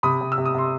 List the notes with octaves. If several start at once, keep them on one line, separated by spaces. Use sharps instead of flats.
C3 B5 D#6
C3
E6
C3
D#6
C3 C6